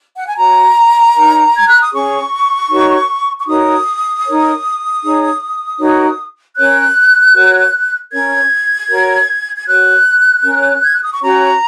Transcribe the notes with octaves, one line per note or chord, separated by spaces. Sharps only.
F#5
G#5
F#4 C#5 A#5
D#4 A#4 C#5
G#6
F#6
D#6
C#4 G#4 C#5 C#6
D#4 F#4 A#4 C#5
C#6
D#4 F#4 A#4 C#5 D#6
D#4 A#4 C#5
D#4 G#4 C#5
D#4 F#4 A#4 C#5
C#4 A#4 C#5 F#6
F#4 A#4 C#5
C#4 A#4 C#5 G#6
F#4 A#4 C#5
G#6
F#4 C#5 F#6
C#4 A#4 C#5
G#6
F#6
D#6
C#6
C#4 F#4 C#5 A#5